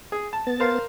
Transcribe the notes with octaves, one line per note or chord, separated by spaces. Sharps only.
G#4
A5
B3 A6
A#4 C5 F5